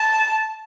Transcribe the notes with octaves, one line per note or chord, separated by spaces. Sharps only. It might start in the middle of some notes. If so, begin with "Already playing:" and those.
Already playing: A5